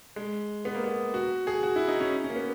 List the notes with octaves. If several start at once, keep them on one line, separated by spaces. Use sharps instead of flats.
G#3
B3
A#3
B3
F#4
G#4
F#4
E4
D#4
C#4
C#4
A#3
B3